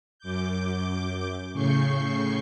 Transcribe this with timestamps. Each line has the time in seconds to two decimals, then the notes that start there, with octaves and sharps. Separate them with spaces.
0.19 F#2 D6 G6
1.53 A2 C#3 C#6 G6 C7